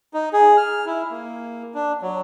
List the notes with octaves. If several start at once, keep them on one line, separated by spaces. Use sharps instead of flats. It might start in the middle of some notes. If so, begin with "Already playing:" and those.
D#4
G#4
F6
E4
A#3
D4
F#3